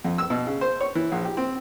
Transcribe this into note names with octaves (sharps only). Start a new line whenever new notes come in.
F2
E6
B2
C#3
C5
C#5
E3
A#1
G4
C4